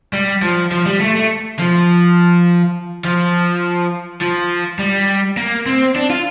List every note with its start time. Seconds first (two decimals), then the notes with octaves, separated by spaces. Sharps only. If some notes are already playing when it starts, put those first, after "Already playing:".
0.13 G3
0.42 F3
0.72 F3
0.86 G3
1.00 A3
1.15 A3
1.59 F3
3.05 F3
4.21 F3
4.79 G3
5.37 A#3
5.66 C4
5.96 D4
6.10 F4